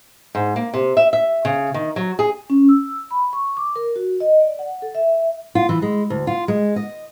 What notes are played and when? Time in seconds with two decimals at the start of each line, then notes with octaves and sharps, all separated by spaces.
0.35 G#2
0.56 A#3
0.74 C3
0.97 E5
1.13 E5
1.45 C#3
1.74 D#3
1.96 F#3
2.19 G#4
2.50 C#4
2.69 E6
3.11 B5
3.33 C#6
3.57 D6
3.76 A#4
3.96 F#4
4.20 D#5
4.40 D5
4.59 F#5
4.82 A4
4.95 E5
5.55 F4
5.69 E3
5.82 G#3
6.10 D2
6.27 F4
6.48 G#3
6.76 D#5